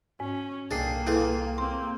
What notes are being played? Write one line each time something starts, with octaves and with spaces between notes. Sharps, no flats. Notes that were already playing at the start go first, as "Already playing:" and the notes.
G#2 C#4
C2 A#3 D4 G#4 A4 G5 C7
E4 F4 G#4 A4 B4 F#5
A#3 C4 C6